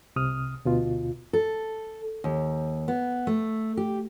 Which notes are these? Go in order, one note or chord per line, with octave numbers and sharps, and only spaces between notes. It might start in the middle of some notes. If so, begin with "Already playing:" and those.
C2 C3 D#6 F6
D2 B2 F4
A4
D#2
B3
A3
G4